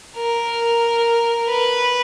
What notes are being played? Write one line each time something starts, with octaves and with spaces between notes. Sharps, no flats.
A#4
B4